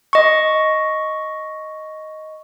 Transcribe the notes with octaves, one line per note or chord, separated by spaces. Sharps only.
D#5 C#6